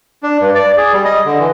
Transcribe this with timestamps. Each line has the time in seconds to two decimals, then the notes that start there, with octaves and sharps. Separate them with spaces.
0.23 D4
0.40 G2
0.55 D5
0.77 G#4
0.93 G3
1.05 D#5
1.25 D3
1.39 E3